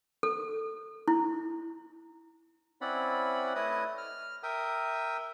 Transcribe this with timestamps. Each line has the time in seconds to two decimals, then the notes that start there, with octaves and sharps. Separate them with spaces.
0.23 A4
1.08 E4
2.81 C4 C#4 E4 D5 F#5 B5
3.55 A3 E4 B4 C#5 D#5 D#6
3.98 F6
4.43 A#4 E5 G5 D#6